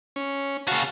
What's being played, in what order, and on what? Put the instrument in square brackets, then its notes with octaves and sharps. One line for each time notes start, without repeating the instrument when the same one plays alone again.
[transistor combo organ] C#4
[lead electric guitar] C#3 F#4 [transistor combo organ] F5 A5